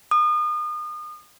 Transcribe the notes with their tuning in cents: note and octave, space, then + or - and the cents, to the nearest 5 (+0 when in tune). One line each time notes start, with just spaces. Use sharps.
D#6 -35